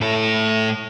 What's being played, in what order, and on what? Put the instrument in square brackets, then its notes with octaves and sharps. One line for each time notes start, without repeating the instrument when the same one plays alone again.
[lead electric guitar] A2 A4